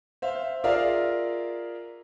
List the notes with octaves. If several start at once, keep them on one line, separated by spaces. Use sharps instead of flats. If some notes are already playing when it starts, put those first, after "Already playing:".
C5 E5 F5
F4 G#4 A#4 D5 E5 F5